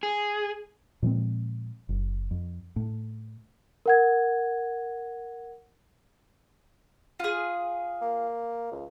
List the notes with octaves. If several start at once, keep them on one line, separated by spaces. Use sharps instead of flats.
G#4
A#2 F3 G#3 C4
F#1
F2
A2
A#4 F#5 G#6
F4 G#4
A#3
C#2